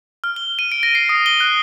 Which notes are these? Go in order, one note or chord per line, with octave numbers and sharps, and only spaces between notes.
F6
G7
D#7
D7
A#6
C7
D#6
G7
F#6